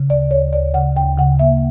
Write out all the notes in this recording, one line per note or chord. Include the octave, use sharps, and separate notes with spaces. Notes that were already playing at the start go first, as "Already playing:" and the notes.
Already playing: C#3
D2 D5
D2 C#5
D2 D5
C#3 F#5
D2 G5
C#3 F#5
A#3 E5